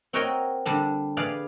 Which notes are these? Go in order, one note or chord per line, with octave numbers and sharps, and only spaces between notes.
C4 F#4 A#4 C#5 D#5 G5
D3 G3 D4
G#4 B4 D5 F5